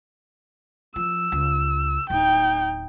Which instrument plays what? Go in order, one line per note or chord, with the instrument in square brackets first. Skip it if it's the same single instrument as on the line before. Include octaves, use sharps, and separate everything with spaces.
[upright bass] F3 [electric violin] E6
[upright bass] C#2
[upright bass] D1 [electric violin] D#4 G5